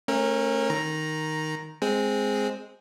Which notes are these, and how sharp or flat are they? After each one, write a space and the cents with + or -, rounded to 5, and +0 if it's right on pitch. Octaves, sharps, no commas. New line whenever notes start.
A3 +0 C#4 -35 A#4 +0
D#3 +0 A#5 +5
G#3 +0 C4 +0 G#4 +0